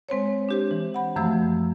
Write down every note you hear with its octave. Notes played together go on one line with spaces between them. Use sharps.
G#3 C4 C5 C#5
D4 G4 C5
E3
F#5 B5
F#2 E3 F3 A3 E6